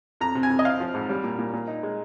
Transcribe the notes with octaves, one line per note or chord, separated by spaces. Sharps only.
F2 A#5
C3
G#5
F2
D#5
C4 F5
F3
G#2
G3
A#2
A#2
A#2
D#4
G#3